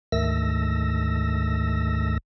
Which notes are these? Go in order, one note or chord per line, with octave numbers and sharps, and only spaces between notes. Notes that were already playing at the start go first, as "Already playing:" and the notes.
D2 G#2 D#3 A3 E6 A#6